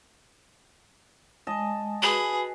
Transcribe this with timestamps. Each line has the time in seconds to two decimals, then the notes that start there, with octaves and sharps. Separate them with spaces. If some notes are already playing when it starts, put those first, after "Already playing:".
1.47 G#3 D#5 G#5 A5
2.02 F#4 G#4 B4 G#5 B5